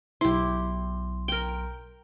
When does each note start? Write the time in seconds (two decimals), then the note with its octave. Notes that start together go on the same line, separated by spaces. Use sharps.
0.21 B1 E4 G4 C6
1.28 A#4 G5